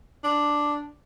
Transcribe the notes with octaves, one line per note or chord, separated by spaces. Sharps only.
D4